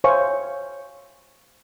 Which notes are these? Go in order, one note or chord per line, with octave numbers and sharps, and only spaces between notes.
C5 C#5 E5 F5 G#5 C#6